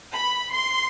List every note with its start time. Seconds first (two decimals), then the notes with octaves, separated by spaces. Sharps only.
0.13 B5
0.51 C6